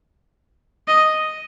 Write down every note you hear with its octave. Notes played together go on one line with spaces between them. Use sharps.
D#5